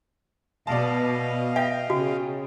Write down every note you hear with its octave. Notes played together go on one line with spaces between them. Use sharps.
B2 D5 D#5 F5 A5
E5 G5
C#3 F#4